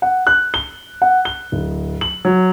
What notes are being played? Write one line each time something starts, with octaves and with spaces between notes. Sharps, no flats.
F#5
F#6
G7
F#5
G7
D1
F#7
F#3